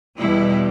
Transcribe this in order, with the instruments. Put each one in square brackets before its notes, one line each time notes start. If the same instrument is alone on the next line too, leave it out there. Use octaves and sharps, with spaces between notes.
[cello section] E2 B2 G3 E4